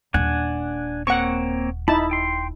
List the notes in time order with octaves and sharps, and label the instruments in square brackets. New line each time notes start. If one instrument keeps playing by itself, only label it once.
[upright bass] D#1 [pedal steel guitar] D4 F#5 G#5
[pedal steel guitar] A#3 C4 C#5 [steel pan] F#5 C#6
[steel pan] D#4 E4 A5 [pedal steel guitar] B5
[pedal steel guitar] G5 C6